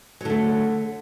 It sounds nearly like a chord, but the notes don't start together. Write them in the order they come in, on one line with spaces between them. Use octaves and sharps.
F#3 D3 A3